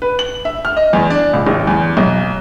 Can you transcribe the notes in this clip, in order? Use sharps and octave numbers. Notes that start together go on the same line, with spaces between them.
B4
F#7
E5
F6
D#5
E2
D4
C#2
A1
E2
B1